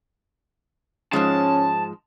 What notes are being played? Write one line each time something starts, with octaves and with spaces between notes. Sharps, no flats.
G#2 F3 G#3 C#4 A5